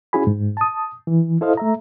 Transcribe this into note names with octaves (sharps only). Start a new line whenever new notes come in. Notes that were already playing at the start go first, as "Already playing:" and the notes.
C#4 E4 F#4 G#4 G#5 B5
G#2
A5 D#6
E3
E4 A4 C5 D#5 F5
A3 E5 A#5